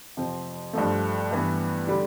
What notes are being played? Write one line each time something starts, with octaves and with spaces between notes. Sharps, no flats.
F2 C3 F3 C4
G2 F3 A3
G2 E3 B3
D3 G3 D4